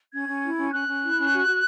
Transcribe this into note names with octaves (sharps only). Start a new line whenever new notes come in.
C#4 G#6
C#4
E4
C#4
C#4 F#6
C#4
E4
C#4
F#4
F#4